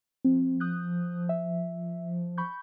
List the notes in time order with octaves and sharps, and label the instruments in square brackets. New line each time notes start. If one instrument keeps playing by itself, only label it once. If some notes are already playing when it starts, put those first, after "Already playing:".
[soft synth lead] F3 [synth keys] C4
[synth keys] D#6 F#6 G6
E5
B5 C#6 G6